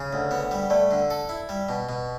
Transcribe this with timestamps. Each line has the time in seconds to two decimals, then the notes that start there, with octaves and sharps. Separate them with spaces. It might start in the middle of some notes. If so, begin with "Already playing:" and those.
Already playing: C#3
0.13 D2
0.31 B3
0.51 G3
0.70 A3 D5
0.91 D3
1.10 A4
1.29 E4
1.49 G3
1.69 B2
1.89 B2